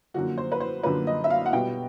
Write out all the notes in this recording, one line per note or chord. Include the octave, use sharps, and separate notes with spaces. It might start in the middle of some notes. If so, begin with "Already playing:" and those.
F#2 D3 F3 A#3 F#4
C5
B4
C5
F#2 D3 F3 A#3 B4
D#5
E5
F5
F#5
B2 G3 B3 G5